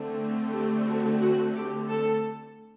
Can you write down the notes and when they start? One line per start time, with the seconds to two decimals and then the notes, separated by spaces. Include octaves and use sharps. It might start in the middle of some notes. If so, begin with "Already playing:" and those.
Already playing: D3 A3 C4
0.53 G4
0.87 F#4
1.20 F#4
1.55 G4
1.88 A4